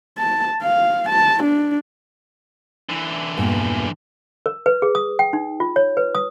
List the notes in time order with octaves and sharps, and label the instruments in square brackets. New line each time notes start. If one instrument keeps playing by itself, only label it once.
[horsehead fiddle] A5
F5
A5
D4
[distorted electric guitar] D3 E3
[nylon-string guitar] E2 G2 A#2
[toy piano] A#4
B4
G#4
D#6
G5
D#4
F4
C#5
B4
D#6